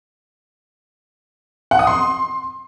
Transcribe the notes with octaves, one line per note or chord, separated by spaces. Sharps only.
F#5
D#6
C6